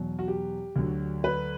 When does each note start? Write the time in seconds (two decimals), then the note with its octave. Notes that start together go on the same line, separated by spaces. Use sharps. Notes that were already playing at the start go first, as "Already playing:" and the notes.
Already playing: E2 B2 F#3
0.19 F#4
0.28 G4
0.76 D2 D3 F#3
1.24 B4